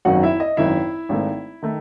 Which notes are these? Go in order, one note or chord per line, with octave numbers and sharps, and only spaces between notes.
G#1 F#2 D#3 F#4 F#5
E4 E5
D#5
G#1 F#2 D#3 E4 E5
G#1 G#2 D#3 A3
D#3 A3